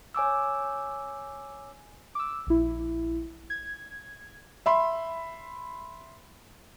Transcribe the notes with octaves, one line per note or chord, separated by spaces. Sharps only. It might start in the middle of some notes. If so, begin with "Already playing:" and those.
C#5 G#5 D6 E6
D6 E6
A#1 E4
G#6
E5 B5 C6